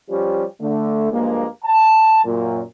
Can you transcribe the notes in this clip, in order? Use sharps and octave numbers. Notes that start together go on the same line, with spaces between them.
F3 G3 C#4 G4
D3 A3
G2 F3 G#3 A#3
A5
F#2 A#2